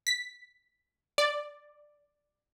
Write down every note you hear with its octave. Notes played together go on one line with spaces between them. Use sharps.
B6
D5